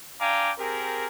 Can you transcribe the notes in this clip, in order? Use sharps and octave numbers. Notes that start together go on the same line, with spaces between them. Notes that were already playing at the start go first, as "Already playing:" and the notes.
D4 F5 G5 G#5 A#5 D6
C4 G4 G#4 A#4